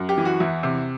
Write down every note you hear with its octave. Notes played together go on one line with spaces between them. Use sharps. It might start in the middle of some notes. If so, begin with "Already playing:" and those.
Already playing: F#2
G4
E3
F#4
E2 E4
C3